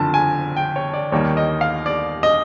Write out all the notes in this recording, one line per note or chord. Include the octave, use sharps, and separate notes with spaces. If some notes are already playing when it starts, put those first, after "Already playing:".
Already playing: F#1 F2 D3 A5
G#5
G5
C#5
D5
D#2 D#3 G3 A#3 C#5
D#5
F5
D5
D#5